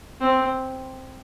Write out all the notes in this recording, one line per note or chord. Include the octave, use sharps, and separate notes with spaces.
C4